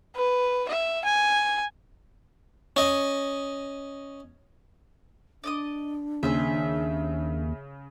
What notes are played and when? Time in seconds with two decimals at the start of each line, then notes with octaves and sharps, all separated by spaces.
0.16 B4
0.68 E5
1.04 G#5
2.76 C#4 D#5
5.44 D4 D5 D#5 D#6
6.23 D#2 C#3 G#4 C5 E5